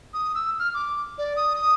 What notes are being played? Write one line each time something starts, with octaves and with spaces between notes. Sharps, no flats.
D#6
E6
F6
D6
D5
D#6
D#6